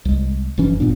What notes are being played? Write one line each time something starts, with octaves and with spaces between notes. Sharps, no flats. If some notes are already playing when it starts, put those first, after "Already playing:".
C2 G#3
F1 F#2 E3 C#4
G1 A#2 B3 D4